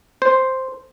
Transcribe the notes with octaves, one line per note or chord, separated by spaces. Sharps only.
C5